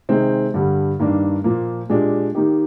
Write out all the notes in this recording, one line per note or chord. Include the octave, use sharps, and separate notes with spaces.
C3 D#3 G#3 C4
G2 D3 G3
G2 D#3 A#3 D4
A#2 F3 A#3
A#2 G#3 D4 G4
D#3 A#3 D#4 G4